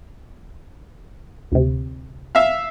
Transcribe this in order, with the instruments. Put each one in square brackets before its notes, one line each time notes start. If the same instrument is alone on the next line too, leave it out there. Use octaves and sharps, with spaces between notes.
[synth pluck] D2 C3
[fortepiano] E5 F5